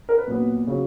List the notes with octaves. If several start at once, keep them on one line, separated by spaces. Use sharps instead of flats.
A#4
B4
A#2 F#3 B3
C#3 F#3